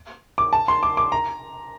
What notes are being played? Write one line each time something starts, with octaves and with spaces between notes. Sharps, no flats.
D6
A5
C6
D6
D6
A#5